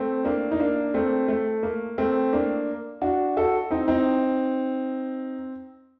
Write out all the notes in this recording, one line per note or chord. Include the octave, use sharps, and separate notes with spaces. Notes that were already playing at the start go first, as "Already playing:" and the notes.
Already playing: A3 C4
A#3 D4
D#4
A#3 D4
A3 C4
A3
A#3
A3 C4
A#3 D4
D4 F#4
F#4 A4
C4 D#4
C4 D#4